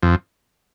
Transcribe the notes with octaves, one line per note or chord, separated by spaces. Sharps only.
F2